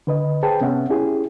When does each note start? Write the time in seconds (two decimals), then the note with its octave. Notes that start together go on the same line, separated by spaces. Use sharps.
0.07 D3 B4 D#5
0.43 G#4 B4 C5 G5 A5
0.61 C3 B3 C#4 E5 F#5
0.90 C#4 E4 G4 G#4